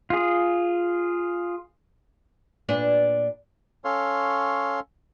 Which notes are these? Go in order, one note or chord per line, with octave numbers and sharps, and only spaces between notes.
F4 G#4
A#2 D4 B4
C#4 A4 C#5 F5 C6